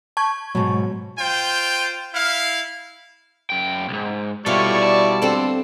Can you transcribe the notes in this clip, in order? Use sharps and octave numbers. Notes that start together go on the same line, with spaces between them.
A5 C#6 G#6
G#2 B2 F#3
F4 C5 G5
E4 F5
F#2 G5
C2 G#2
B2 G3 E4 F4 A4 C#5 D5 C#6
A5
D3 C4 A4 D5